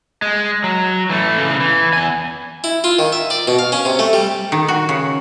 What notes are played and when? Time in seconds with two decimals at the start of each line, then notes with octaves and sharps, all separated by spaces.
0.22 G#3
0.64 F#3
1.10 E3 A3
1.38 C#3 E3
1.60 E3
1.93 E2 G#5
2.64 E4
2.84 F4
2.99 D#3
3.12 E5
3.30 D5
3.48 B2
3.59 F5
3.72 C#4
3.85 C3
3.99 A3
4.13 G3
4.52 D#3
4.68 F#4
4.89 C#3